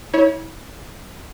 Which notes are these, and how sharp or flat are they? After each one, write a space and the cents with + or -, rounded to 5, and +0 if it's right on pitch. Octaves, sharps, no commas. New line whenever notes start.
E4 -35 C#5 +0